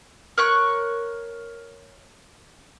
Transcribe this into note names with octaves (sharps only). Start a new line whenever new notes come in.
A#4 C#5 C#6 F#6